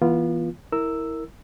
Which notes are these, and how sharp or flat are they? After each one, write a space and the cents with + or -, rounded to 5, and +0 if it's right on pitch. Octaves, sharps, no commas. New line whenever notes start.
E3 +0 B3 -35 F4 -15
E4 -20 A#4 -10 E6 +0